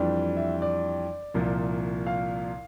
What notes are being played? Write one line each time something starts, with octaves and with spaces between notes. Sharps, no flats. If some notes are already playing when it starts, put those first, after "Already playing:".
Already playing: F2 E3 G3 D4
E5
D5
C2 A#2 F3
F5